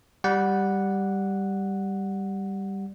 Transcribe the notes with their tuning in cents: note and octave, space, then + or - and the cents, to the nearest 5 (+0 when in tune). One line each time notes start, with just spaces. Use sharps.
G3 +0 F#5 -5